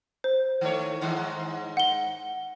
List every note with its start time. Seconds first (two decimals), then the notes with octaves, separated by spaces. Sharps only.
0.24 C5
0.61 D#3 A3 C#5
1.01 G#2 D#3 G#3
1.77 F#5 G7